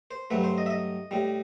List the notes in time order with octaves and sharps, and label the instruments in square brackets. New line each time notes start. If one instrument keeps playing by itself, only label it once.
[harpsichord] C5
G2 F#3 A3 B4
C5
D#5
E5
D#5
A2 G3